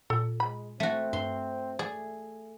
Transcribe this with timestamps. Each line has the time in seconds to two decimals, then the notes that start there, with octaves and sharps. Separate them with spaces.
0.10 A#2 A4
0.40 G#3 B5
0.80 A3 C4 F#4
1.13 G2 C6
1.79 A3 G#4 D5